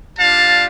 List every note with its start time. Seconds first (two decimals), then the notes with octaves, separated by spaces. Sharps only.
0.18 G3 D4 F4 F5 A5